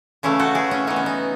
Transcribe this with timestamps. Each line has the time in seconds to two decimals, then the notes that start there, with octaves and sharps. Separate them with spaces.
0.23 C#3 E3 A3 C#4 E4
0.39 F#4 A4
0.55 E4 G#4
0.71 C#4
0.87 E3 B3 D#4
0.96 C#4
1.06 D#4